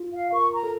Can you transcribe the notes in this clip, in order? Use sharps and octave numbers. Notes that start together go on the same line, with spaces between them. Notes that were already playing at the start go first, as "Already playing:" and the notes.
Already playing: F4
F5
A#4 C#6
A#5
A4